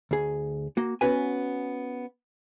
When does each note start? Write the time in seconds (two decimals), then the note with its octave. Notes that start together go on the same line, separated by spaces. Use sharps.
0.11 D2 G#4
0.77 A#3 F#4
1.01 B3 C#4 F#4 B4 G#5